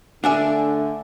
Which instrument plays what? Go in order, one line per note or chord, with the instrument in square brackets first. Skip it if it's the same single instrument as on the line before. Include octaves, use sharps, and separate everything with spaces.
[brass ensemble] D3 A3 [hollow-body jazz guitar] D4 D5 E5 [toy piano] F#5 G#5 A5